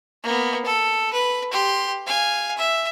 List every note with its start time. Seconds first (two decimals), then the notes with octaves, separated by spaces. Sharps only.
0.23 A#3 B3
0.65 A4
1.13 B4
1.52 G4 C6
2.06 F5 G#5
2.57 E5